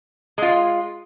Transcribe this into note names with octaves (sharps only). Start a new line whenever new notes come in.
G#3 F4